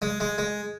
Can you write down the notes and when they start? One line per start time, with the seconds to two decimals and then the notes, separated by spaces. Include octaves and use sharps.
0.02 G#3
0.20 G#3
0.38 G#3